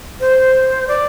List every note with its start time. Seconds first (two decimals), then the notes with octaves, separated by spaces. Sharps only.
0.20 C5
0.88 D5